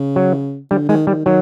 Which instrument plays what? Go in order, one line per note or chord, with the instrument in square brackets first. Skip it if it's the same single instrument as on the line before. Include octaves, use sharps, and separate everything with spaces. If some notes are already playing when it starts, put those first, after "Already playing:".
Already playing: [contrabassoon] C#3
[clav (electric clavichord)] F#3
[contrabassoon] D3 [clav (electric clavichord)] G3
[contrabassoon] D#3 [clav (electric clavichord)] G#3
[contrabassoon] D#3 [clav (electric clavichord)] G3
[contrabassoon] D#3 [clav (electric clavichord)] F#3